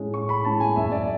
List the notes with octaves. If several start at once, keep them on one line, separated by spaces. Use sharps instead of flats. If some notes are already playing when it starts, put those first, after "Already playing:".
Already playing: A2 G#3 C#4
A2 C#6
B5
G#3 C#4 A5
G#5
F#2 E5
D5